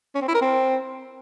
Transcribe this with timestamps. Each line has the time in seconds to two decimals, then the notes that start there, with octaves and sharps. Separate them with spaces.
0.15 C#4
0.22 C4
0.28 E4
0.35 A#4
0.41 C4